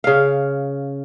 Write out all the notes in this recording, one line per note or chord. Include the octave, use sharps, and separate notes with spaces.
C#3 F5